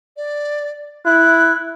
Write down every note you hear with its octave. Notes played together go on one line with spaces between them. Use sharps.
D5
E4 F#6